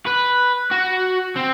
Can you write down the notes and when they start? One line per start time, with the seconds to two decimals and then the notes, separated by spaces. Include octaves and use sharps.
0.06 B4
0.71 F#4
1.36 C4